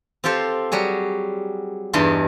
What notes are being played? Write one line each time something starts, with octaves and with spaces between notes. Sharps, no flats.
C4 F4 G4 A4 C5
F#3 G3 F#4 G#4
E2 G2 E3 D#4 A5 C6